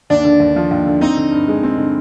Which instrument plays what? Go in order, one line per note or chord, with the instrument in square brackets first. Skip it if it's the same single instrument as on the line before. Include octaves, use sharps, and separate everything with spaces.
[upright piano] D#2 [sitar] D4
[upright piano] D3
D#2
F3
D#2
D3
[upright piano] C4 [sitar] D#4
[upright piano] D3
G2
G#3
C4
D3